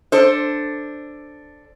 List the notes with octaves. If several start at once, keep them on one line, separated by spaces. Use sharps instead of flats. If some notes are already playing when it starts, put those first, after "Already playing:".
D4 A4 C5